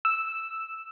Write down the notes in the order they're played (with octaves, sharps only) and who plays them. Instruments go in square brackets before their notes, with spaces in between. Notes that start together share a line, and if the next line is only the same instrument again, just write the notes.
[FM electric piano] E6